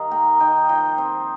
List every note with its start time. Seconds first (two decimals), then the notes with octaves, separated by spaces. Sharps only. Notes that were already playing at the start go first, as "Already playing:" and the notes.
Already playing: D#3 G3 D#5 F5
0.11 A#3 G5 A#5
0.40 D#3 D#5 G5
0.69 F3 D#5 G5
0.98 C4